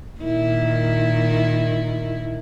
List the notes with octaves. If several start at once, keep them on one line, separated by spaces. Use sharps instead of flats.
A#2 D#3 E4